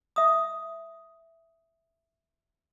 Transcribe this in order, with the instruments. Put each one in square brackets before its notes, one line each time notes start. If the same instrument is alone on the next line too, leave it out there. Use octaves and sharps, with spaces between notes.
[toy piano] E5 D#6